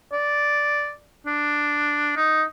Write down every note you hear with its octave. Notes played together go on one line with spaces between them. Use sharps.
D5
D4
D#4